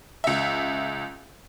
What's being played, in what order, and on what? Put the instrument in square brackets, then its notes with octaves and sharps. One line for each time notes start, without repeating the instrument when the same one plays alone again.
[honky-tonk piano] C#2 E5